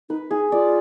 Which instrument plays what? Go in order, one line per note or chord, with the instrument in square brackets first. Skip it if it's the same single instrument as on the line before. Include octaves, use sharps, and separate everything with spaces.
[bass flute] D#4 [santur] B4
[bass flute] D#4 [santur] G#4
[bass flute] F4 [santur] D5